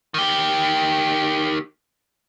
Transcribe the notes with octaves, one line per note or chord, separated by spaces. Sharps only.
D#3 G4